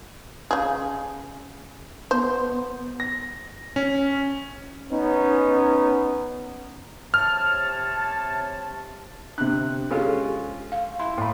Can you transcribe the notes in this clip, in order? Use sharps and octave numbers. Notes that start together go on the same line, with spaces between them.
C#3 G#4
B3 C5
A#6
C#4
B3 C#4 D#4
C3 C#5 A5 F6
C3 D4 F#6
G#3 C#4 F4 G4 A4
F5
E4 C6
A2 B5